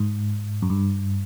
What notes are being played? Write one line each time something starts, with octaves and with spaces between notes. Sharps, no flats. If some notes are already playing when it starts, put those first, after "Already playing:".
Already playing: G#2
F#2
G2